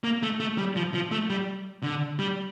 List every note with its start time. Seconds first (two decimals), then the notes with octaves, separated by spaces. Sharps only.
0.04 A#3
0.23 A3
0.40 A3
0.58 G3
0.76 F3
0.94 F3
1.11 A3
1.30 G3
1.83 D3
2.19 G3